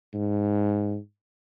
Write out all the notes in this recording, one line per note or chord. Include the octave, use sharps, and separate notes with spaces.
G#2